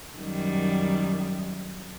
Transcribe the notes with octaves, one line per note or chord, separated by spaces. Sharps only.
F#2 D#3 G3